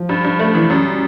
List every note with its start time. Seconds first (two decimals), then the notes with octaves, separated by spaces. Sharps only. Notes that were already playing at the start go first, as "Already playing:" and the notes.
Already playing: F3
0.09 G2
0.24 G2
0.39 A3
0.55 E3
0.70 F#2 G3